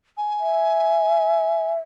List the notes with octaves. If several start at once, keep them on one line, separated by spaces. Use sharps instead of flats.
G#5
E5